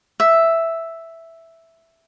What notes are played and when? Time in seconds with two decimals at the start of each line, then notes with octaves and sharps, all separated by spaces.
0.20 E5